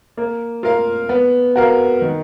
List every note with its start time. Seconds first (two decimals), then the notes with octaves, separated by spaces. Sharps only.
0.17 A#3
0.63 F4 A#4 F5
1.09 B3
1.56 F#4 A#4 F5
2.01 D#3